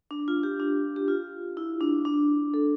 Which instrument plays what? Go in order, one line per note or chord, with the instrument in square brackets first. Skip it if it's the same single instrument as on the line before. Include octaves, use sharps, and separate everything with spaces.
[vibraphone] D4
F4
G4
D4
G4
F4
E4
D4
D4
A4